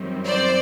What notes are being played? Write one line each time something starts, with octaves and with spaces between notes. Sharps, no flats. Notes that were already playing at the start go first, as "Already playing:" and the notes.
Already playing: F#2 D#3 G3 C4
C5 D5